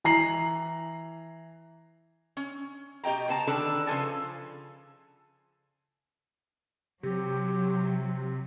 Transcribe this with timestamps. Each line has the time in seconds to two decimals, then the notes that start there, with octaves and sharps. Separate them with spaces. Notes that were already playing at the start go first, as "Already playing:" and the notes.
0.04 E3 A#5 C7 F#7
2.37 C#4
3.04 B2 G4 D#5 G5 A#5
3.28 C#3 B3 A5 A#5
3.47 D3 D#3 D4 A4 B4
3.87 C#3 F3 A4 G#5
7.03 C3 F#3 G4